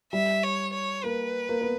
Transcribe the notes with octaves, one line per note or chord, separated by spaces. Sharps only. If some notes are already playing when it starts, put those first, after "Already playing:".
G3 E5
C#5
C#5
A#3 B4
A#3
B3